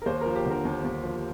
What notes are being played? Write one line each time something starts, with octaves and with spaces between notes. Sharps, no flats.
A#4
D#2 C5
F3 A#4
G4
D3 A#4
D#2
D#2
F3